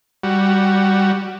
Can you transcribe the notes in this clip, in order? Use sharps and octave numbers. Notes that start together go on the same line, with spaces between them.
G3 F#4